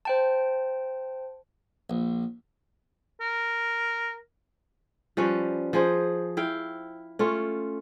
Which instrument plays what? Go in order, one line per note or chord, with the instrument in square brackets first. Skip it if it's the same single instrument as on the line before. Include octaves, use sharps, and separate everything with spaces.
[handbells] C5 G5 A5
[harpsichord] A#1
[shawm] A#4
[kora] F3 G3 C#4 B4
F3 G#4 C5
E4 F5 G5
A3 C#4 F4